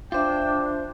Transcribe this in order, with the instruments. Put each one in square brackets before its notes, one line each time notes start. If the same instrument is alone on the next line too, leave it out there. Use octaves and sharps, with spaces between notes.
[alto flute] D4 [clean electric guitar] F4 C5 [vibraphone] E5 D6 [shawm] G5